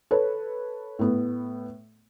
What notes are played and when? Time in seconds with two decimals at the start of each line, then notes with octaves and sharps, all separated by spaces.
0.11 A4 B4 C#5
0.99 A2 B3